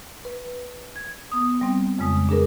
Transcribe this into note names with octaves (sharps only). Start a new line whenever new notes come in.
B4
G#6
B3 D#6
G3 C4
F2 C#3 G#3 D#6
D4 G#4 A#4 B4